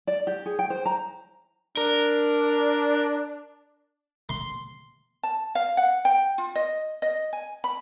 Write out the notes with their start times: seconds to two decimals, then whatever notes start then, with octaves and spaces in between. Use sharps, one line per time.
0.07 D5
0.27 G4
0.46 G#4
0.59 G5
0.70 C5
0.86 A#5
1.77 D4 A#4
4.29 C6
5.23 A5
5.55 F5
5.77 F#5
6.05 G5
6.38 F4
6.55 D#5
7.02 D#5
7.33 G#5
7.64 B5